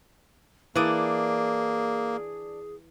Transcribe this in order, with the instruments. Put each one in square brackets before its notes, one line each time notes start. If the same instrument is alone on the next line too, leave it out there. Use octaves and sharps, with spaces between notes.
[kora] E3 [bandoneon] A#3 [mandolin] D4 D5 D#6 [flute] G#4